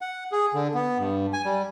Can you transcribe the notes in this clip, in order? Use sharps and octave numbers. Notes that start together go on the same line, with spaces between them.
F#5
G#4
D3
B3
G2
G#5
G3